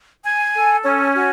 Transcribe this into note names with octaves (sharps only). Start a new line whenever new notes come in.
G#5
A4
C#4
F#4